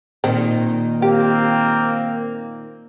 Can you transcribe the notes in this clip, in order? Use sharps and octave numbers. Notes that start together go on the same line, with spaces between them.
A#2 D#3 C4
A#3 C4 G4